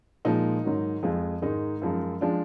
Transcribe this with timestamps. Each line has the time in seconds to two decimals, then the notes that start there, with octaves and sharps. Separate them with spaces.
0.25 A#2 F3 G#3 D#4
0.64 G#2 D#3 F#3
1.03 F2 F3 G#3
1.42 G#2 D#3 G#3 D#4
1.82 F#2 F3 G#3
2.21 F3 G#3 D4